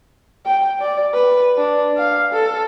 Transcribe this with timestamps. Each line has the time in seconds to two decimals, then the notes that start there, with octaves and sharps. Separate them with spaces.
0.46 G5
0.82 D5
1.14 B4
1.58 D4
1.98 F5
2.33 A4